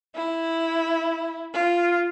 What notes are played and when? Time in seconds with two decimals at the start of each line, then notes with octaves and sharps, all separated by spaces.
0.15 E4
1.54 F4